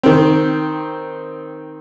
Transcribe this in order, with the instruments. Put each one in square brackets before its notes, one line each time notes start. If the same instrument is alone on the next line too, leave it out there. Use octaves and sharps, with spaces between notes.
[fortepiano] D#3 C4